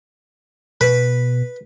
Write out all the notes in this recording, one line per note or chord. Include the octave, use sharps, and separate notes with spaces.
B2 B4